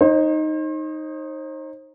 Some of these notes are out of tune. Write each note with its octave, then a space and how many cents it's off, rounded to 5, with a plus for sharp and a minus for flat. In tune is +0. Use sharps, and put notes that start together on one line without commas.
D#4 +0 C5 +40